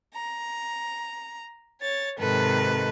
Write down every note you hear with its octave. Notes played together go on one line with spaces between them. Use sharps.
A#5
C#5 A6
G#2 C3 D#3 A4 B4